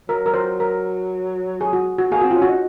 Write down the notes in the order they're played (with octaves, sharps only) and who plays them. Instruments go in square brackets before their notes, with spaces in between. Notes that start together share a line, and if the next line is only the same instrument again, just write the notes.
[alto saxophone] F#3 [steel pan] A#4
[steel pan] A#4
C5
A#4
G#4
F#4
F#4
[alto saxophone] A#3 [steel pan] G#4
[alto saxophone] C4 [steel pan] F#4
[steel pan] F4
[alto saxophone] C#4
[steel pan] F#4
[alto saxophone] D#4